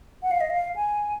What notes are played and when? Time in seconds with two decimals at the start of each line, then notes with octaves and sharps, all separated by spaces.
0.23 F#5
0.31 F5
0.41 D#5
0.50 F5
0.76 G#5